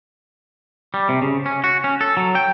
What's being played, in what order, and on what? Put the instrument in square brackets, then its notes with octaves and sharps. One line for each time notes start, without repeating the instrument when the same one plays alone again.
[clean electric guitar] G3
C3
C#3
C#4
F#4
C#4
A4
F#3
G5